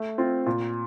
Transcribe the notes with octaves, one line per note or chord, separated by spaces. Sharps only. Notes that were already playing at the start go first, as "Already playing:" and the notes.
Already playing: A3
C4 F4
A#2